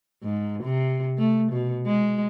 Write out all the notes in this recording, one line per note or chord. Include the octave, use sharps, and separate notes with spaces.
G#2
C3
A3
B2
G#3